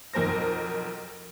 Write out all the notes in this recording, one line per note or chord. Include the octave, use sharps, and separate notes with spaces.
B1 F2 A#4 C5 A#6